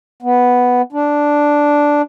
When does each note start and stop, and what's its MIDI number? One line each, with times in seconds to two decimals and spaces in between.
0.22 0.82 59
0.92 2.02 62